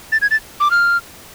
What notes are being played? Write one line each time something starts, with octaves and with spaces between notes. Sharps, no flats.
A6
G#6
A6
D6
F6